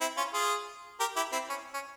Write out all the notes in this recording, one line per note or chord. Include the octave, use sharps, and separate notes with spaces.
C4 E4
C#4 F4
F4 G#4
G4 A#4
E4 G4
C4 E4
C#4
C#4